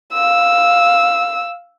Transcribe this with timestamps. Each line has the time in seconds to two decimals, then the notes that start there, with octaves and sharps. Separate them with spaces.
0.13 F5 E6